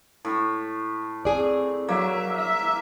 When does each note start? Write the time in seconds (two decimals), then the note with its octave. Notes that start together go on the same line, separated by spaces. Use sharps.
0.25 A2
1.25 C4 G#4 D5
1.89 F#3 A#3 E5
2.37 E5